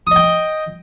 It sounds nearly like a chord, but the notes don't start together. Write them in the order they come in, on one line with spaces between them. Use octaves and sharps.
D#6 D#5 G5